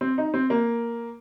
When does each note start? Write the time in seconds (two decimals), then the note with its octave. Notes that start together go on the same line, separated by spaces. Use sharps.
0.01 C4
0.18 D#4
0.34 C4
0.50 A#3